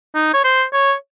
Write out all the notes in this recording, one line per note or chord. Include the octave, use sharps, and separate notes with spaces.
D#4
C#5
C5
C#5